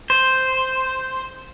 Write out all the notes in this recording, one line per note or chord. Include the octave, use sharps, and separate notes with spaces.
C5